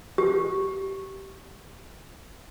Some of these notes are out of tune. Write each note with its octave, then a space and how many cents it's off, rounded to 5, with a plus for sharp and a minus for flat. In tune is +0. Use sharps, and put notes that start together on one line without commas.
G4 -20